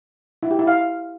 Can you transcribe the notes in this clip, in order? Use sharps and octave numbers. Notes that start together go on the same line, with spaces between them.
E4
G4
E4
F5